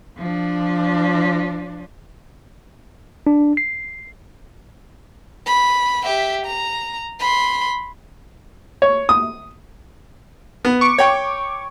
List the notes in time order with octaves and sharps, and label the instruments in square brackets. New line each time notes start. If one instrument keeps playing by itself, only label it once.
[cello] F3 D4
[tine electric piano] D4
C7
[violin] B5
G4 E5
A#5
B5 C6
[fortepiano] C#5
D#6
B3
[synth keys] C#6 D6
[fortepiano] C#5 G5